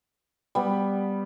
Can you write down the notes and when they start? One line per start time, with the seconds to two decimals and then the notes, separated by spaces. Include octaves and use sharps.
0.55 G3 B3